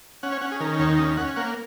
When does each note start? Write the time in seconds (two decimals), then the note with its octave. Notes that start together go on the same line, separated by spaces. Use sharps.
0.23 C#4 F#5
0.32 C#5
0.41 C#4 F#5
0.52 G#4
0.60 D#3 A#4
0.79 D#2 C#5
0.99 C#4 D#5
1.17 C#4 F#5
1.36 A#3 F#5